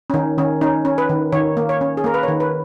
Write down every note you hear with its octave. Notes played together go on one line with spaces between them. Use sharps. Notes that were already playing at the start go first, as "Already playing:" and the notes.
C#4
D#3 D#4
D#3 C#4
C#4 D#4
C#4
B4
D#3
D#3 C#5
A#3
C#5
C#4
G#4
A#3 A#4
B4
D#3 C#5
B4